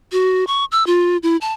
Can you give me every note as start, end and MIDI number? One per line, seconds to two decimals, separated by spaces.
0.12 0.44 66
0.47 0.65 85
0.72 0.86 88
0.87 1.17 65
1.23 1.37 64
1.41 1.53 81